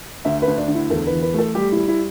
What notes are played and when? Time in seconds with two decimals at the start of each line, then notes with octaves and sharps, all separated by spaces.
0.25 D2 E5
0.42 B4
0.48 D2
0.57 D4
0.68 D3
0.75 E4
0.90 E2 A4
1.07 B4
1.12 E3
1.22 B4
1.34 A3 A4
1.55 G3 G4
1.72 G3 E4
1.88 E4